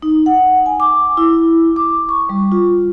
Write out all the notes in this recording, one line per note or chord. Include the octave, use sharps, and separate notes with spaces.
D#4
F#5
G#5
D6
E4
D6
C#6
G3
F4